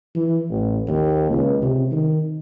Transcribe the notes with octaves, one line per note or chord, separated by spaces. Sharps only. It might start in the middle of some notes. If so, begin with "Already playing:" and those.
E3
A1
D#2
C#2
C3
D#3